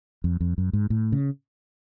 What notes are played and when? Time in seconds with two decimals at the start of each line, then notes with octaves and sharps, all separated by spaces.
0.24 F2
0.40 F2
0.58 F#2
0.73 G#2
0.90 A2
1.12 C#3